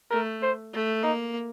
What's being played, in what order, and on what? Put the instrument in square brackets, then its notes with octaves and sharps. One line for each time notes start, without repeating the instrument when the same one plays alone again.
[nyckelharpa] A3 [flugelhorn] A#4
[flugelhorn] C5
[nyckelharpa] A3
[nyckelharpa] A#3 [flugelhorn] D#4